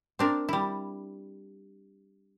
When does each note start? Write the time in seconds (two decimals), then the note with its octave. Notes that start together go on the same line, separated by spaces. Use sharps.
0.19 C4 D4 A#4
0.49 G3 E4